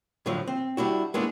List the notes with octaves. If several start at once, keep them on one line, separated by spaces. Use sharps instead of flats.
A2 D3 F3 F#3
C4
G3 D4 E4 F#4
G#3 A#3 B3 C#4 D4 E4